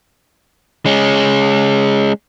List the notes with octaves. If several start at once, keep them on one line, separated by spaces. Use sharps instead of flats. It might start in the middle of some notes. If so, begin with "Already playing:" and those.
G#3 C#4